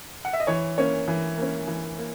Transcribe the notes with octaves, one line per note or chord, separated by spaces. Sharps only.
F#5
E5
D#5
E3 C#5
A#3 C#4 C#5
E3
A#3 C#4
E3
A#3